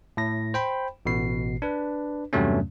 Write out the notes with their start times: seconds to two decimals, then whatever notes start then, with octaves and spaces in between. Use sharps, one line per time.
0.17 A2 A#6
0.54 C5 G5 B5
1.06 A1 B2 C7
1.62 D4 B4
2.33 E2 G2 C3 F#3 A3 C#4